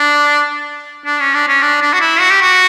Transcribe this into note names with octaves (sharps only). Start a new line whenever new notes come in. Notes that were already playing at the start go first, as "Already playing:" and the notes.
Already playing: D4
D4
C#4
D4
C#4
D4
D4
F#4
E4
F#4
G4
F#4